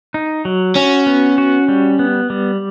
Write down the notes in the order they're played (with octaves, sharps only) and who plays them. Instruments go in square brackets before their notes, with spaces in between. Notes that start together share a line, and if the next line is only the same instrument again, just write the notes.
[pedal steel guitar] D#4
F#3
[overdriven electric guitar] C#4 [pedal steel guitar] F#4
[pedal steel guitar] B3
F#4
G3
B3
G3